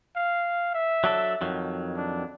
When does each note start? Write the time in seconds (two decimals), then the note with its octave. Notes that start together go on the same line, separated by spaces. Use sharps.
0.16 F5
0.75 E5
1.04 F#3 D4 A4
1.41 F2 D#3 F#3
1.97 D4